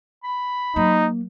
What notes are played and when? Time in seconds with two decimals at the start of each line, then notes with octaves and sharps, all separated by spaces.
0.24 B5
0.76 F#3 A#3 D#4